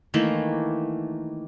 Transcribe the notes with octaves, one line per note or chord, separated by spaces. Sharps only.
D#3 E3 A3 A#3